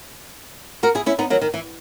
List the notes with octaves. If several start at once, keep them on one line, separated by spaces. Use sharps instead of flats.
F#4 A#4
E4 G#4
C#4 E4
B3 D#4
D#3 F#3
D#3
E3